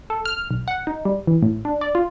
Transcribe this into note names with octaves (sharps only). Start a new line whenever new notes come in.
A4
F6
B1
F#5
D#4
G3
E3
A2
D4
D5
F4